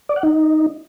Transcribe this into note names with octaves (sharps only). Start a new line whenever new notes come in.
D5
F#5
D#4